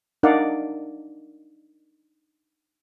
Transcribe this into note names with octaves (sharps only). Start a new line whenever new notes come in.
D4 D#4 A#4 D5 F5 F#5